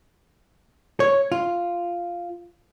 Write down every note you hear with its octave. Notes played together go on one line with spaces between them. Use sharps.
C#5
F4